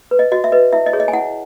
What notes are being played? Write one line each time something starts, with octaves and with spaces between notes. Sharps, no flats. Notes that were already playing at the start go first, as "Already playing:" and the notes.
B4
D#5
F#4 D#5
E5
B4 D#5
E4 E5
D#5
G#4 C#5
D#5
G#5
E4 F#5